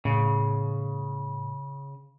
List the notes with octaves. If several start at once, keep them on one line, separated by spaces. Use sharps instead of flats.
A2 C#3